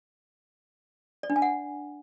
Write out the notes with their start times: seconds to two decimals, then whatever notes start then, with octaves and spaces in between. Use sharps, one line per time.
1.23 D5
1.30 D4
1.36 G#5
1.42 F#5